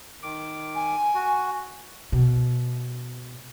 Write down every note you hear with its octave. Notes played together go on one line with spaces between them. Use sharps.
D#3 D6
G#5
F#4
B2